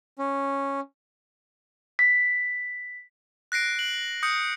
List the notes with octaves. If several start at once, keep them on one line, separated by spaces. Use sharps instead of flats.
C#4
B6
F#6 A#6 C7 D7
F#7
D#6 G6 C#7